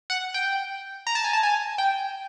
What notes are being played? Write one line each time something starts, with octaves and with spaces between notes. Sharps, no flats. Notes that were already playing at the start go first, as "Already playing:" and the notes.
F#5
G5
A#5
A5
G#5
A5
G#5
G5